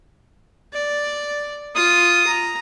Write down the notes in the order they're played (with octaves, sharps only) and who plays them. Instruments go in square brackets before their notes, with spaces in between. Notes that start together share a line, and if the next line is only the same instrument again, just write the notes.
[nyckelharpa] D5
[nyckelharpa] F4 [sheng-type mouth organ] D#6
[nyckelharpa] A#5